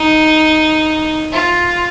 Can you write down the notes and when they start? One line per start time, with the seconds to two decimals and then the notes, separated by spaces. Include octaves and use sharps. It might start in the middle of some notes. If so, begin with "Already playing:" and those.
Already playing: D#4
1.32 F4